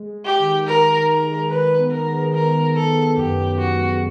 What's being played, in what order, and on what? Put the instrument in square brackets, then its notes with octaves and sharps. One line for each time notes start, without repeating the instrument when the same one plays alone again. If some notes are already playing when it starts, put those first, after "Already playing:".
Already playing: [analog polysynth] G#3
G#3
[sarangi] G4
[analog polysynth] D#3
[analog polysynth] D#3 [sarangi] A#4
[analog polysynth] D#3
[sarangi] A#4
[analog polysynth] G#3
[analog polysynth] D#3 [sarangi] B4
[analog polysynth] B3
[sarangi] A#4
[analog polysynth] G#3
[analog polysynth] G#3 [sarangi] A#4
[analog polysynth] D#3
[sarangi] A4
[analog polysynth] B3
[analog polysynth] F#2 [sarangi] G4
[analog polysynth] F#2
[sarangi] F#4
[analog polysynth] G#3